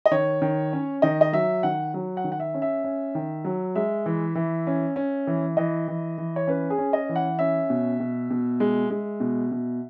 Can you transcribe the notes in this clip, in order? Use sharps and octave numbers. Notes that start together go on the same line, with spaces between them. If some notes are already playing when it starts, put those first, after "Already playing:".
D#5
D#3 C#5
D#3
C#4
D#3 D#5
D#5
F#3 E5
D#3 F#5
F#3
F#5
D#3
F#5
E5
C#4
E5
C#4
D#3
F#3
G#3 E5
E3
E3
C#4
C#4
E3
E3 D#5
E3
E3
C#5
C#4 B4
G#4
C#4
D#5
E3
F#5
C#4 E5
B2
B2
B2
G#3
G#3
B2
B2